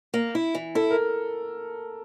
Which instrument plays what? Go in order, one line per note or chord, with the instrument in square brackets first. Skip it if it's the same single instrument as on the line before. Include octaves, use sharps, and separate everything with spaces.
[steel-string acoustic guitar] A#3
E4
E3
[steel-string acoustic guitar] E4 [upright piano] A4
[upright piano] A#4